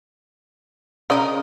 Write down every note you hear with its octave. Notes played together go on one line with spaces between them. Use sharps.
C#3 C#4 A#4 B4 D5 D#5